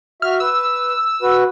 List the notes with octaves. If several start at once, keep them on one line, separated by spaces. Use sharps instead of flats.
F#4 E5 F6
B4 E6
F#4 B4